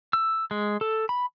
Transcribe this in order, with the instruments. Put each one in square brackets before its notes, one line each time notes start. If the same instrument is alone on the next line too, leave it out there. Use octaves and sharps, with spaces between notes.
[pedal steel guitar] E6
G#3
A4
B5